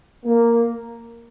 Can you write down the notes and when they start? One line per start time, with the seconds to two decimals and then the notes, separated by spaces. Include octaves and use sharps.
0.25 A#3